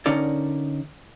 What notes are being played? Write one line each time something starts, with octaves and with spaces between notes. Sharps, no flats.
D3 C#4 D#4 A#4 D5